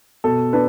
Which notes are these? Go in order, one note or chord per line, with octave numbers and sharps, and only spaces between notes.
B2 A4
D4 B4